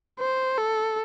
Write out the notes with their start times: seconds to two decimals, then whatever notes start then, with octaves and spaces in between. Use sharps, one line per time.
0.19 C5
0.58 A4